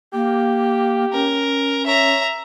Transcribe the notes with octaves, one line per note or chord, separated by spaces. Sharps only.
A#3 G4
C#4 A#4
C#5 E5 A#5